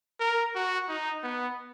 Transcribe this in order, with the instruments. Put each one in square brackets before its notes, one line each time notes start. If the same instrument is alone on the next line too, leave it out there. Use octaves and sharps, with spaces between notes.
[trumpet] A#4
F#4
D#4
B3